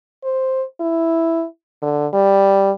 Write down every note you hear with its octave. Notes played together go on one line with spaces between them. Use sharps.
C5
E4
D3
G3